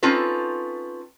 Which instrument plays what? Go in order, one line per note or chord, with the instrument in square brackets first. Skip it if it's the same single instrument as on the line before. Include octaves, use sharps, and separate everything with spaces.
[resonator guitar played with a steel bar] C4 C#4 D#4 F4 A4 B4